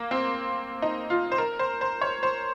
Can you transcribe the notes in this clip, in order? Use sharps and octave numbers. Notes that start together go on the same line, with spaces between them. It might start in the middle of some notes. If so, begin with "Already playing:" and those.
Already playing: A#3
C4
D#4
F4
C5
A#4
C5
C5
C#5
C5